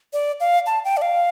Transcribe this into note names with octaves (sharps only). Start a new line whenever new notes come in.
D5
F5
A5
G5
D5
F5